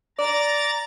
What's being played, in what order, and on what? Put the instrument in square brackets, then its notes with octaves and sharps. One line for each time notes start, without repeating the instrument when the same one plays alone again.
[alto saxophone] D5 [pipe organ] A#5 A6